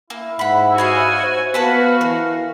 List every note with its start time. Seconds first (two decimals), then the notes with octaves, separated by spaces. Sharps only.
0.10 A#3 E4
0.39 G#2 F#5 B5
0.78 F#4 C#5 D#5 F5 G#5
1.19 C5
1.54 B3 F#4 B4 F5 A5 B5
2.01 E3 A#4